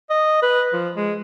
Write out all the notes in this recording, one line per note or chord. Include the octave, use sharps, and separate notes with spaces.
D#5
B4
F3
G#3